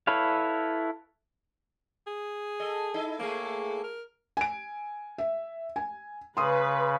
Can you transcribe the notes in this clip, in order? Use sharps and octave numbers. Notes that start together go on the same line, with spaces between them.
E4 A4 B4 C#5 F5
G#4
A4 D#5
D#4 E4 D#5
A2 A3 A#3 G#4
A#4
G#5 D7
E5
G#5
C#3 B4 C6 D#6